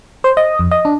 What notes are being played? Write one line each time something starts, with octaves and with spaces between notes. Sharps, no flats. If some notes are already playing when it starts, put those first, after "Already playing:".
C5
D#5
F2
D#5
D4